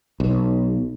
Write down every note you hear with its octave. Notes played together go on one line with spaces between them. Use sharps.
B1